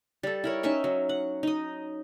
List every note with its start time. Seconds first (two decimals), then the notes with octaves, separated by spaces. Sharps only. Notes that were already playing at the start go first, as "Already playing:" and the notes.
0.23 G3 A4
0.44 E4 A#4 C#5
0.63 C#4 D#4 E5 C#6
0.84 F#3
1.09 F#5
1.43 D#4 D#5